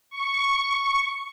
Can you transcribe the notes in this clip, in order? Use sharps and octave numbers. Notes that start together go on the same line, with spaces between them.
C#6